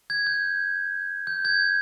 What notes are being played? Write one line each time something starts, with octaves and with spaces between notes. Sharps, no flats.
G#6
G6
G6
G#6